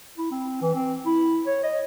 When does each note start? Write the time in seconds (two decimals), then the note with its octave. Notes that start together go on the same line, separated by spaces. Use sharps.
0.17 E4
0.31 C4
0.61 E3
0.74 C4
1.06 E4
1.46 C#5
1.63 D#5